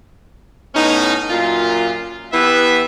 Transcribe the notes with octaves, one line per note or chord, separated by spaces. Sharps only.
A2 B3 C#4 D#4
F#2 A#2 F4
E3 B3 G4 B4 E5